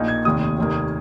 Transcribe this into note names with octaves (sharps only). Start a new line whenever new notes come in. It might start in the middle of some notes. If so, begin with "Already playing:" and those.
Already playing: A#1 A#2 A#3 D#4
G#6
F1 D#2 D#3 D#6
F1 D#2 D#3 A#3